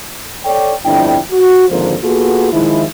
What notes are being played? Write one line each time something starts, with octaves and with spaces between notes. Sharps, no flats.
A4 C#5 D5 G5
G1 F2 D4 E4 G5
F#4
G#1 D3 F3 A#3 C5
A#3 B3 F4 F#4 G#4 A4
D#3 F3 G#3 E4